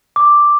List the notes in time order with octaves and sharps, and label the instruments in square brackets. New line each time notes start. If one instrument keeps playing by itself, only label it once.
[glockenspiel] D6